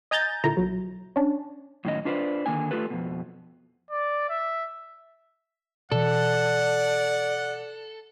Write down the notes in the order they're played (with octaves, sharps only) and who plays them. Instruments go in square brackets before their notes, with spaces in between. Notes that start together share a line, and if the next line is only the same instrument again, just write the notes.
[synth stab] D#5 G#5 A#5 G6 A6
A#2 D3 E4 A#5
B1 F#3
C#4 D4
[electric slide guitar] F#2 A2 D#3 C#4 D#5
D4 F4 B4 C5 D5
D3 D#3 A#3 D#4 G#5
A3 F4 G4 A4 B4
F2 B2
[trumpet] D5
E5
[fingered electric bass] B2 E3 [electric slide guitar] A4 [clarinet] D5 [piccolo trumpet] F#5